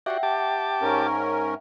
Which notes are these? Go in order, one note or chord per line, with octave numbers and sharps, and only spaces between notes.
F#4 G4 D5 E5 F#5 G5
G4 A5 D6
G#2 C#4 A#4